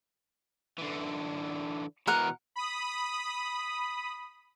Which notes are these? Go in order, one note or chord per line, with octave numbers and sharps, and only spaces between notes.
D3 E3
B2 E3 A#4 F#5
B5 D#6